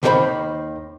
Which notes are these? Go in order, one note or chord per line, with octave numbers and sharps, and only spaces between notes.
D#2 D#3 A#3 A#4 C5 B5